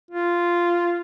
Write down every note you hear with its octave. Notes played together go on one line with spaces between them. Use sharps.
F4